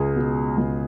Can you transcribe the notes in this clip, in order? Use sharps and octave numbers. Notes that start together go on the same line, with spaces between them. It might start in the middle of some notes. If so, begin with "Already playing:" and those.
Already playing: C#2 G#4
B2
C#2